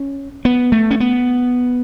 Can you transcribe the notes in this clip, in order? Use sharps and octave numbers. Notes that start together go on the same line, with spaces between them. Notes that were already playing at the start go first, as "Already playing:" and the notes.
Already playing: C#4
B3
A3
C#4
B3